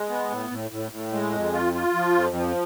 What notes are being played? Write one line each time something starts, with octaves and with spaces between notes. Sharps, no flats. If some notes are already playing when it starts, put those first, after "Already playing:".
Already playing: G#3
B3
A2
A2
A2
A2
G#3
F2
F4
F4
F3
F2
F3